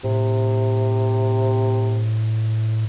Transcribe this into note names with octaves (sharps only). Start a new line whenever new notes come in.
A2 C3